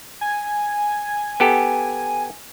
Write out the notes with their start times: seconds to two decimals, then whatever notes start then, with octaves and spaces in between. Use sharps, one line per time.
0.21 G#5
1.40 B3 G4 A4